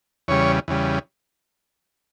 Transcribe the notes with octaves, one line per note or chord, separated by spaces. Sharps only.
E2 C#3 G3 C#5
E2 C#3 G3